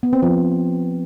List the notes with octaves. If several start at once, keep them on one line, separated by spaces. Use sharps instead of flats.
B3
C4
F3